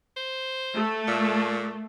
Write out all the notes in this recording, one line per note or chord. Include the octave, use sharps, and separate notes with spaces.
C5
A3
A#2